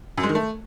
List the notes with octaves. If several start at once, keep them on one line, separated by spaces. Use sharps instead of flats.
F#2
G#3
D#3
A3